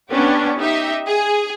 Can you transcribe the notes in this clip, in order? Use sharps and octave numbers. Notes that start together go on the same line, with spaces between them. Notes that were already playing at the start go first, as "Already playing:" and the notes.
B3 C#4 D4 G4
D#4 G4 E5
G#4